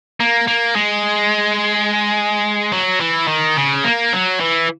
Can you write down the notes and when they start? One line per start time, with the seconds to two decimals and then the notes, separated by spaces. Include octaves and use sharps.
0.20 A#3
0.48 A#3
0.76 G#3
2.73 F#3
3.01 E3
3.28 D#3
3.57 C#3
3.84 A#3
4.13 F#3
4.40 E3